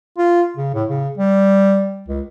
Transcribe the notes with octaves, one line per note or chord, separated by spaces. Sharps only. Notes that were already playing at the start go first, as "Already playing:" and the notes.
F4
C#3
A2
C#3
G3
C#2